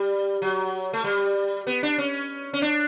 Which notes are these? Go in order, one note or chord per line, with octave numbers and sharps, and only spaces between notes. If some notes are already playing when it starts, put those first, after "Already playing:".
Already playing: G3
F#3
A3
G3
B3
D4
C#4
C#4
D4